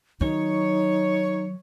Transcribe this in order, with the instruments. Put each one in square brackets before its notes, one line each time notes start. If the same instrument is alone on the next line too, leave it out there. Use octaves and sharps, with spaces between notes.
[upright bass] D#3 F#3 [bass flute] D#4 [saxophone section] C#5